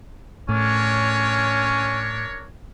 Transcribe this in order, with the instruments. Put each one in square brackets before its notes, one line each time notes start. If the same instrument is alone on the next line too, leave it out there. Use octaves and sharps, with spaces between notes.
[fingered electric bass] A2 [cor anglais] C#4 [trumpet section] D4 A#4 C#5